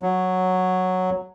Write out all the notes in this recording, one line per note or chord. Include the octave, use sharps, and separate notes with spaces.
F#3